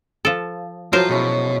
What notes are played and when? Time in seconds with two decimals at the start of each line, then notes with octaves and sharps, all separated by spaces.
0.25 F3 A4
0.93 F#2 A2 F3 F4 A#4 C5
1.09 B2 G#3 C#4 E4